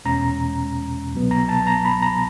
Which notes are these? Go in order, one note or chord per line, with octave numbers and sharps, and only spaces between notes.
E2 B2 G#3 C#4 A#5
C2 B2 F#3 B3
A#5
A5
A#5
B5
A#5